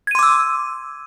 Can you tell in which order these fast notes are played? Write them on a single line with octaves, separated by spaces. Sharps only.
G#6 D#7 C6 D6 E6